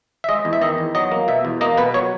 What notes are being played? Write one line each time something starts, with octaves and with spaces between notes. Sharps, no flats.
E5
G#3 D#5
E2
E5
D#3 D#5
E2
F#3 D#5
A#3
B2 E5
E2
A#3 D#5
B2 B4
F#3 C#5